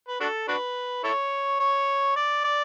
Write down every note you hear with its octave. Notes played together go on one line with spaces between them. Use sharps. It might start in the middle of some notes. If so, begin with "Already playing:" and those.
B4
D4 F#4 A4
D4 F#4 B4
E4 A4 C#5
C#5
D5
D5